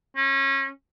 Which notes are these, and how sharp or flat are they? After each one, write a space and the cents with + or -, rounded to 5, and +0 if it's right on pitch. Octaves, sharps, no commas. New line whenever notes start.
C#4 -30